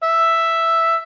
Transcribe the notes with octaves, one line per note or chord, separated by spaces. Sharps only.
E5